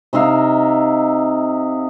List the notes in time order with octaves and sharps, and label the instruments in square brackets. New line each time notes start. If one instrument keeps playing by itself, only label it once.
[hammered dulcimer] C3 D#4 E5 F5